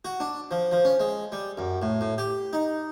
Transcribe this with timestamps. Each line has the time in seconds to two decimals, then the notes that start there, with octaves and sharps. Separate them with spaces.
0.05 F#4
0.20 D4
0.51 F3
0.72 F3
0.85 C#4
1.00 G#3
1.32 G3
1.58 F#2
1.82 A2
2.01 A2
2.18 G4
2.53 D#4